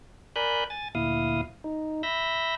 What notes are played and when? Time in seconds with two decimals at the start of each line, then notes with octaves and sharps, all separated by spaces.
0.36 A#4 D5 G#5 B5 F#6 G6
0.70 G#5 A6
0.95 D2 A#2 E4 F5 D#6
1.64 D#4
2.03 E5 B5 E6 G6 A#6